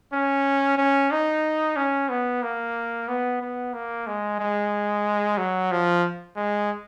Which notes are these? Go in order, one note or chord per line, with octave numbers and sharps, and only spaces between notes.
C#4
C#4
D#4
C#4
B3
A#3
B3
B3
A#3
G#3
G#3
F#3
F3
G#3